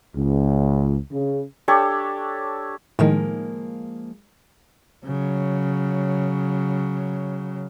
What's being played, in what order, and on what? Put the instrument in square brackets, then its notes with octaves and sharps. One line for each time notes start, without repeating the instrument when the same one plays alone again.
[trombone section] C#2
C#3
[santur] D4 G4 A4 C#5
[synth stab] A2 D#3 [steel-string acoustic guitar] F3 G#3 A#3
[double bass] C#3 F#3